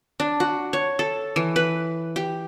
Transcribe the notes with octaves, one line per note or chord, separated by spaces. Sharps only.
D4
F#4
C#5
A4
E3
B4
G4